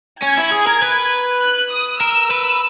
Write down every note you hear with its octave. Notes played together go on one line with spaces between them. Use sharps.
C#4 G#6
E4
G#4
A#4
B4
F#6
D#6
A#4 E6
B4